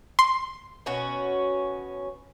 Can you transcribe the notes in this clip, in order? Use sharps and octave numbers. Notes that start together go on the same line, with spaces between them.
C6
B2 C#4 F#4